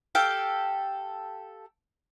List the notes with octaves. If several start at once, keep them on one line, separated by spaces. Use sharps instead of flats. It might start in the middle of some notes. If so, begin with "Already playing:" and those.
G4 A4 F5 G5